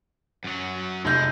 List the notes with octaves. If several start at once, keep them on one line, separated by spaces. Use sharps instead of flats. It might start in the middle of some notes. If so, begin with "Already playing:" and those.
F#2 F#3
F1 G#3 G6